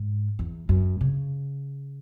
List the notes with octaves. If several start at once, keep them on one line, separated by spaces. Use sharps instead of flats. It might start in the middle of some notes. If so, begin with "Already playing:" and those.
Already playing: G#2
E2
F#2
C#3